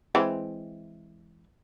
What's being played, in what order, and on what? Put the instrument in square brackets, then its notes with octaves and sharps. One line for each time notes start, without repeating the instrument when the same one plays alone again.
[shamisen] E3 G#3 C4